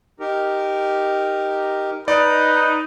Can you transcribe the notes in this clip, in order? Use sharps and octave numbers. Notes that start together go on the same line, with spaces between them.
D#4 G4 A#4
D#4 B4 D5